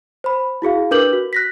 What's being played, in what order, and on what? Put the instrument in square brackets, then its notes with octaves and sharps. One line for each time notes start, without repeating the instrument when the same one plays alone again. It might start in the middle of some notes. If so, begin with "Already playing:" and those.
[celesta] C5 B5
E4 F#4 G#4 F5
D4 A#4 B4 D6 G6 F#7
F#4
F#6 A#6 B6